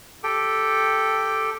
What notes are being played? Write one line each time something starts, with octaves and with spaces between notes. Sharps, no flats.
G4 A4 G5